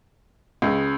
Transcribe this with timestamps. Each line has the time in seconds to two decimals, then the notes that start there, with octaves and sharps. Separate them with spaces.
0.62 C#2 C#3